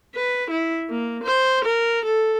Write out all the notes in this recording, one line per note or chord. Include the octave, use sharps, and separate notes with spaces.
B4
E4
A#3
C5
A#4
A4